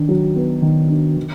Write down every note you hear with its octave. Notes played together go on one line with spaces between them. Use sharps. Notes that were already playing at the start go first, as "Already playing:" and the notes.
Already playing: D#3 D4
F#3
B3
D#3
D4
D#3